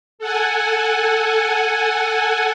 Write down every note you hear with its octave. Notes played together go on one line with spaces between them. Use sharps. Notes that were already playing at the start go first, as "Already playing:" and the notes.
A4 F#5 G#5